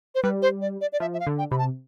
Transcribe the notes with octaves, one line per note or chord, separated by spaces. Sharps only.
C5
G3 B4
C5
D5
D5
D5
F3 E5
E5
F5
D3
G5
C3 B5
A5